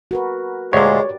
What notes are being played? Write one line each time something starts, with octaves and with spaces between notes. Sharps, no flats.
F#4 A#4 B4
D2 A#2 G#3 G4 C#5 D5